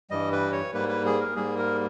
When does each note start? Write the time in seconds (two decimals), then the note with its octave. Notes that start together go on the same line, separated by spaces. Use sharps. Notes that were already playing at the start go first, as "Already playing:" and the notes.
0.10 G2 E3 G3 D#5
0.32 B4
0.52 C#5
0.74 G#2 G3 A#3 B4
0.89 B4
1.06 G#4
1.20 A#4
1.36 G#2 G3 A#3 G#4
1.58 A#4